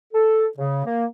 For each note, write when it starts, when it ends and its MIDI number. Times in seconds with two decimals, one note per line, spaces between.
0.13 0.47 69
0.58 0.83 49
0.85 1.04 58